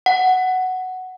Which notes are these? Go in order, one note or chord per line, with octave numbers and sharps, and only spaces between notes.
F#5